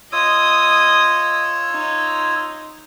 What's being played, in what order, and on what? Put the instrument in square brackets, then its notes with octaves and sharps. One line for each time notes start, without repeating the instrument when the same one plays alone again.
[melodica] F4 C#5 E6 [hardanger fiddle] D#5 D#6
[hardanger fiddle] D#4